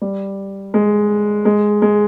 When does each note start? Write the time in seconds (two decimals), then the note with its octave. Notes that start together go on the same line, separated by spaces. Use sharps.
0.02 G3
0.74 G#3
1.45 G#3
1.82 G#3